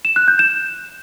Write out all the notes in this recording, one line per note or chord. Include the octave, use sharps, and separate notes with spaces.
E7
F#6
G6
E7